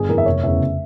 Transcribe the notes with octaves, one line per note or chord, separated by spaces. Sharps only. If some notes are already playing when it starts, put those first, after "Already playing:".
Already playing: G1 G#4
F2 E3 A#4
E5
F1 C#5
E2 C#3 E5